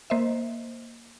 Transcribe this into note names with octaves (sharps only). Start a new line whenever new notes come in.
A#3 C5 D#5 E5